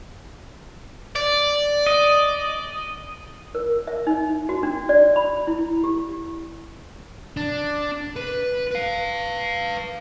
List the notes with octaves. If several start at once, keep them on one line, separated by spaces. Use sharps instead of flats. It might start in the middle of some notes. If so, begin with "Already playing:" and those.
D5
D#5
A#4
E5
D#4
F#4
D4
D5
B5
E4
G4
D4
B4
B4 F5